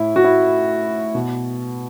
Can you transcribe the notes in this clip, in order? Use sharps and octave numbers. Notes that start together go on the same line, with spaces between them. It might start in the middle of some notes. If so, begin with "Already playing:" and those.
Already playing: A2 E4
F#4
E4
B2